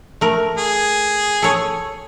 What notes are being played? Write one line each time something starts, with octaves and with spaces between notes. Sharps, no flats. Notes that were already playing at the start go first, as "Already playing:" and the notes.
A3 A#4
G#4
A4 C#5